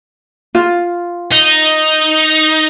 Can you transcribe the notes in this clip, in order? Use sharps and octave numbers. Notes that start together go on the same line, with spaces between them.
F4
D#4